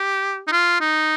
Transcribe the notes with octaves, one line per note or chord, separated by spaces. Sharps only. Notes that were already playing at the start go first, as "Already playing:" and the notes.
Already playing: G4
D#4
F4
D#4